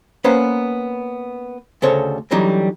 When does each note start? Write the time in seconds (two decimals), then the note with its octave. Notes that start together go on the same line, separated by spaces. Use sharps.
0.24 A#3 B3 C#4 B4 C5
1.82 D2 C#3 A4 C5 C#5
2.31 D3 E3 F#3 G3 D#4